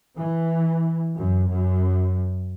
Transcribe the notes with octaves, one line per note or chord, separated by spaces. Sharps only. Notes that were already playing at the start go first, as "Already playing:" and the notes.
E3
F#2
F#2